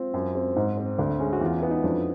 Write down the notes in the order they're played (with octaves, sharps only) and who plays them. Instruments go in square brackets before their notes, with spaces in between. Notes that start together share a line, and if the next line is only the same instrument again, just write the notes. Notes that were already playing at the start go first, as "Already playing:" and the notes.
Already playing: [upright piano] C4 [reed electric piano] F4
[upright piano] F#2
C4
G#2
C4
[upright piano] D2 [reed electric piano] D4
[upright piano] G#3 [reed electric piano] C#4
[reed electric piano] F#4
[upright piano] E2 [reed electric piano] F4
[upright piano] B3 [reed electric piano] E4
[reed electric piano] D#4
[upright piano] F2 [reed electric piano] D4